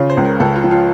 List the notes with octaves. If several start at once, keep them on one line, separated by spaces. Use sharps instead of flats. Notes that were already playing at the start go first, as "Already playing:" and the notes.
Already playing: C#3 F4
C5
C#2
A#4
C#2 A4
F4
F3
F4